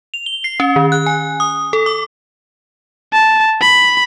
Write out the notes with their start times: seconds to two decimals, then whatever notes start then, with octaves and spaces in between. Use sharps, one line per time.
0.14 F7
0.26 G7
0.44 C7
0.60 C#4
0.76 D#3
0.92 F#6
1.06 G#5
1.40 D#6
1.73 A4
1.86 D6
3.13 A5
3.61 B5